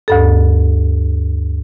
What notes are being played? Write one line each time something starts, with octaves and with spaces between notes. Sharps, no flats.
D2 G2 A4